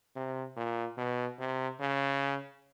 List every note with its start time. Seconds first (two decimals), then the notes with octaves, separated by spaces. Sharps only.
0.16 C3
0.57 A#2
0.98 B2
1.39 C3
1.80 C#3